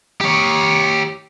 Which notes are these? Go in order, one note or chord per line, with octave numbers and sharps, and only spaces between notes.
G4 C#5